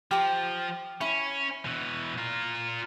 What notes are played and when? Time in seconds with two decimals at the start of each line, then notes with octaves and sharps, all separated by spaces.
0.11 F3 G4 A#5
1.01 C#4 E4 C#6
1.65 B2 E3
2.18 F4 A#4